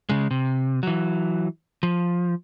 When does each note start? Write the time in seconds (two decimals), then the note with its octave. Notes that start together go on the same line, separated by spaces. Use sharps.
0.09 C#3 G#3
0.31 C3
0.83 E3 F#3
1.83 F3